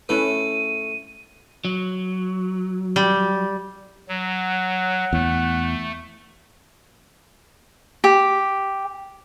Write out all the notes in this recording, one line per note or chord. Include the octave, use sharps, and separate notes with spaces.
A3 C#4 E4 B4 D#7
F#3
G3
F#3 F#5
E2 A3
G4